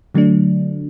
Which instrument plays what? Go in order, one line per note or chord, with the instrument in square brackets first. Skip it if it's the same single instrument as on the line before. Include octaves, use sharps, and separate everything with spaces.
[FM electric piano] D3 F#3 A3 D4